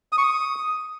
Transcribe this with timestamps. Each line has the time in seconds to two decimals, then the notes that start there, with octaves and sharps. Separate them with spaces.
0.12 D#6
0.18 C#6
0.23 D#6